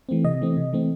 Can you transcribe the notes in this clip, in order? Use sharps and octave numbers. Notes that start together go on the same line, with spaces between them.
E3 A3 C4
C3 D#5
E3 A3 C4
C3
E3 A3 C4